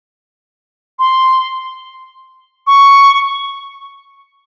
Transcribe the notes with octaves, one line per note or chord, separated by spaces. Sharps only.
C6
C#6